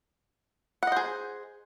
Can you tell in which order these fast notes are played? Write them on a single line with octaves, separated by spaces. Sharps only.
F#5 D#5 C5 G#4